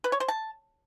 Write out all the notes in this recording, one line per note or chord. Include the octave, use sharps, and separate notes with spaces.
B4
C#5
C5
A5